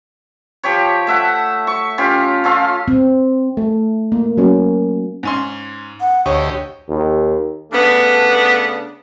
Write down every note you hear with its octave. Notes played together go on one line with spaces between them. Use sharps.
F3 G4 C#5
A3 E5 F#5
C#6
C#4 F4 G4
C#4 F4 A4 F5
C4
A3
A#3
F#3 A#3 C#4
G#2 C#4 C6
F#5
D2 G4 C#5 D#5 C#6
D#2
C#3 A3 B3 D4